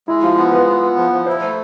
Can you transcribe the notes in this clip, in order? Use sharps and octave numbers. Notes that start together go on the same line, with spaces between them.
G#3 E4
F3 F4
B3
G#3 B4
B3
B3
F3
F3
E4 C5
A3